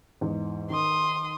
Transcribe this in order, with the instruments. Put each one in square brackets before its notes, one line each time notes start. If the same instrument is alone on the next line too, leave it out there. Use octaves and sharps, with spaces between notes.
[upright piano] E2 G#2
[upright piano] D#3 [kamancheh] C6 D#6